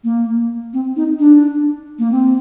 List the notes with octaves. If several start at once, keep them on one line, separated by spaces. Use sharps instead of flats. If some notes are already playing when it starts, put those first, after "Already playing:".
A#3
C4
D#4
D4
A#3
C4